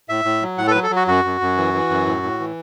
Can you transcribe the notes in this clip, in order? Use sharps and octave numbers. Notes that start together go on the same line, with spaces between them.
A2 E5
A2
F#3
A2 F#5
A4
B4
F#3
A4
F#3
F#4
F#2 F#4
F#2
F#2
E3
E3
F#2
A2
A2
E3